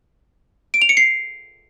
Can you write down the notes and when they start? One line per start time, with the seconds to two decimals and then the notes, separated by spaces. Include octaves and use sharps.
0.74 D7
0.82 F7
0.89 C#7
0.97 C7